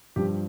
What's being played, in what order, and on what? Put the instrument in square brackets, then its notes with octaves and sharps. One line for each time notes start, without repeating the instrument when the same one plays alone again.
[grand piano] G2 F3 G4